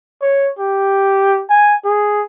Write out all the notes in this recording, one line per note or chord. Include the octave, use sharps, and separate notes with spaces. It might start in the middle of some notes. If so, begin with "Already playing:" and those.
C#5
G4
G#5
G#4